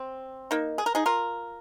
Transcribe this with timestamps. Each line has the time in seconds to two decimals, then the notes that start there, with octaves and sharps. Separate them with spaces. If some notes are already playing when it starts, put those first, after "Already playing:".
Already playing: C4
0.51 A#3 D#4
0.78 G#4
0.86 A#4
0.95 D#4 G#4
1.06 F4 A#4